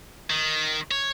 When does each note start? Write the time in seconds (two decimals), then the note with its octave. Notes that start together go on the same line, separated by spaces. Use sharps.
0.30 D#3
0.91 C#5